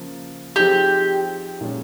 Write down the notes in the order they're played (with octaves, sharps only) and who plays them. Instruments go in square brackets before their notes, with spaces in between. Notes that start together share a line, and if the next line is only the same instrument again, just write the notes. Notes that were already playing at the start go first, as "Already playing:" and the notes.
Already playing: [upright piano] C#3 F3 A#3
[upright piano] F3 C4 D#4 G#4 [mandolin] G4
[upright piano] A#2 F3 G#3 C#4